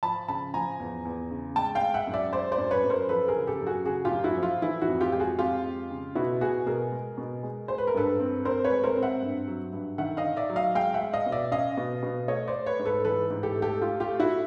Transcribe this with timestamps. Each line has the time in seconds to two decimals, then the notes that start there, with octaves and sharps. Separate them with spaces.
0.03 F3 A5 B5
0.28 C#3 A5 B5
0.54 F3 G#5 A#5
0.80 E2
1.05 E2
1.31 C#3
1.56 G#3 G5 A5
1.75 F5 G5
1.82 G#3
1.94 E5 F#5
2.07 F#2
2.14 D5 E5
2.33 G#3 C5 D5
2.52 C5 D5
2.58 F#2
2.71 B4 C#5
2.84 F#2
2.90 A#4 C5
3.09 F3 A4 B4
3.28 G#4 A#4
3.35 C#3
3.47 G4 A4
3.60 F#2
3.67 F#4 G#4
3.86 C#3 F#4 G#4
4.05 F4 G4
4.11 F#2
4.24 E4 F#4
4.37 F3
4.43 F4
4.62 E3 E4
4.81 E4 F#4
4.88 F2
5.01 F4 G4
5.12 G#3 G4
5.20 F#4 G#4
5.39 F2 F4 G4
5.65 G#3
5.90 C#3
6.15 B2 E4 F#4
6.41 B2 F#4 G#4
6.66 B2 G#4 A#4
6.92 G#3
7.18 B2
7.43 G#3
7.68 G#3 C5
7.78 B4
7.87 A#4
7.94 G2 A4 B4
8.20 C4
8.45 C4 A#4 C5
8.64 B4 C#5
8.71 G#3
8.84 A#4 C5
8.96 C4
9.02 E5 F#5
9.22 G2
9.47 F#3
9.73 G2
9.98 D#3 E5 F#5
10.17 D#5 F5
10.24 D#3
10.36 D5 E5
10.50 F#3
10.56 D#5 F5
10.75 G#3 F5 G5
10.94 E5 F#5
11.01 G#3
11.13 D#5 F5
11.26 B2
11.32 D5 E5
11.52 C#4 D#5 F5
11.77 B2
12.03 B2
12.28 A3 C#5 D#5
12.48 C5 D5
12.54 A3
12.66 B4 C#5
12.79 G#2
12.85 A4 B4
13.05 E3 A4 B4
13.30 G#2
13.43 G4 A4
13.56 A3
13.62 G4 A4
13.81 A3 F4 G4
14.00 F4 G4
14.07 A3
14.20 E4 F#4